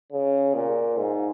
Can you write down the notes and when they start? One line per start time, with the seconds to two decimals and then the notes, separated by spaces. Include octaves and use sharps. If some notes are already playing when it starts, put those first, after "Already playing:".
0.12 C#3
0.54 A#2
0.97 G#2